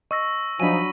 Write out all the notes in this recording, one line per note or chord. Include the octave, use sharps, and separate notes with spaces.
D#5 C#6 E6 A#6
F3 F#3 D4 D#4 G#5 B5 D#7